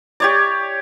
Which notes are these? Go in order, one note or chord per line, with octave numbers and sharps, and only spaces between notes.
G4 C#5 D5